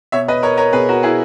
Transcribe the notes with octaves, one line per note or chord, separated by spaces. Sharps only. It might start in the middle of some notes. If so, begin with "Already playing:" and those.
B2 C#5 E5
B4 D#5
A#4 C#5
A#4 C#5
B2 G#4 B4
F#4 A#4
E4 G#4